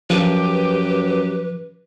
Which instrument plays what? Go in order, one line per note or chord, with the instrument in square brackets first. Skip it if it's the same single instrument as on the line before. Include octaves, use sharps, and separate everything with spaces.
[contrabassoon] F#2 [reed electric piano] F3 [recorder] G4 [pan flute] B4